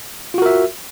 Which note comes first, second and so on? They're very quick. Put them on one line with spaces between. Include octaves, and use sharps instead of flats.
F4 F#4 A#4 E5